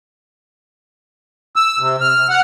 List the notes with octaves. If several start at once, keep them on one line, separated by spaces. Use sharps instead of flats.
E6
C3
F6
F#5